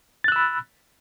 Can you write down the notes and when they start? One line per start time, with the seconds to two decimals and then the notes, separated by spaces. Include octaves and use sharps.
0.24 A6
0.28 F#6
0.32 E6
0.36 B5